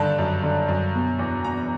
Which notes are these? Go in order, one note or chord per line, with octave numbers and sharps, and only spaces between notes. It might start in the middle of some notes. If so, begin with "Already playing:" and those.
Already playing: G2 D3 D#3 A5
F#2
D3
F#2
B2
E2
B2 A#5